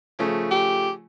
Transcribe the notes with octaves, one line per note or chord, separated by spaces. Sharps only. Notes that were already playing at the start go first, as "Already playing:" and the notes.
C#3 F3 A3
G4